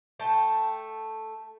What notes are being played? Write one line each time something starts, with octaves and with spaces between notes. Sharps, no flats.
A3 G5 A5